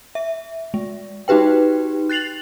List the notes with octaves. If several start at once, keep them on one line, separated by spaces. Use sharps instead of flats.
E5
G#3
D#4 F#4 G4 B4 G5
F#6 A6 C7 F7 F#7